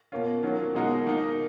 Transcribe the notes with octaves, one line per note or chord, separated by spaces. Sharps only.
B2 A#3 C#4 F4
D#3 F#3 A#3 C#4 F4
B2 G#3 D#4 F#4 A#4
D#3 A#3 D#4